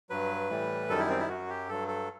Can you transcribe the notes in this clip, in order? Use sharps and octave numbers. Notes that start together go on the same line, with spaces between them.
G2 F#3 B4
A2 E3 G3
F#2 D#3 G3 A4
E4
C4
E4
F#2 F#3 F#4
G4
G2 F#3 A4
A4